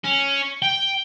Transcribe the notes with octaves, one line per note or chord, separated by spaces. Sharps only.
C#4
G5